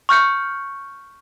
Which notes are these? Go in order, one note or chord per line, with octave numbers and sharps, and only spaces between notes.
C#6 F6 G6 C#7